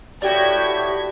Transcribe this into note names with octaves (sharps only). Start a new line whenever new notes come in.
A2 F#4 G4 D5 G5 G#6 B6